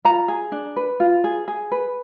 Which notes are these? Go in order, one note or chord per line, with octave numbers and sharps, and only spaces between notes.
F4 A#5
G#4
D4
B4
F4
G#4
G#4
B4